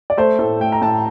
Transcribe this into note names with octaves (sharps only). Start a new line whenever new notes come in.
D5
A3 C5
A2 A4
A3 G5
A#5
A2 A5